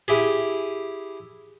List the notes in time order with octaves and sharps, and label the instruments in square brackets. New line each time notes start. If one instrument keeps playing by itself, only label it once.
[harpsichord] E4 G4 G#4